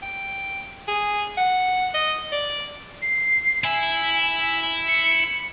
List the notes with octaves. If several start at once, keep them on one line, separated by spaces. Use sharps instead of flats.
G5
G#4
F#5
D#5
D5
C7
E4 G#5
C#7